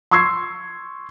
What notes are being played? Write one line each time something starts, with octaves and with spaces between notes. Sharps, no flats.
C6 C#6 E6 G#6 C7